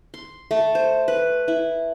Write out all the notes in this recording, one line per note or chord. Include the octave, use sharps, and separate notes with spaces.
C6
A3
C5
B4
E4